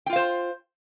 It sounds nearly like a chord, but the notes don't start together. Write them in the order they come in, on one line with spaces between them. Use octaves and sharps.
G5 F4 F5 C5